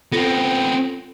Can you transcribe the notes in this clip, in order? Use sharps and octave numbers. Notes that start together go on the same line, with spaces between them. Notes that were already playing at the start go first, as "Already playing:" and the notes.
B3 C4 F4 A4 A#6